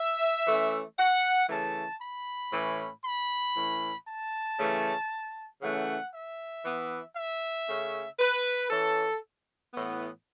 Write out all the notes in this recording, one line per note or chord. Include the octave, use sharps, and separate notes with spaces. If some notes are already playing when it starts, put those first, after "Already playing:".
Already playing: E5
E3 A3 C#4
F#5
C#3 E3 A3 C#4 A5
B5
A2 E3 C#4
B5
A2 E3 C#4
A5
C#3 E3 A3 C#4
C#3 E3 A3 C#4 F#5
E5
E3 B3
E5
C#3 A3 C#4
B4
E3 C#4 A4
A2 E3 B3